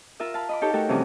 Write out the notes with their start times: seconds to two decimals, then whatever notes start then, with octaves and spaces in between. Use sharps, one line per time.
0.20 F4 A#4 E5 E6
0.34 F5 A5 B5
0.49 D#5 B5 D6
0.61 D#4 G4 A4 C#5 G5 A5
0.73 A3 F#4 G4 A4 A#4
0.88 G2 C3 E3 F3 C#4 F#4